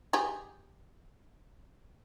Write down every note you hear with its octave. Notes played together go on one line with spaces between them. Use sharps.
G4 G#4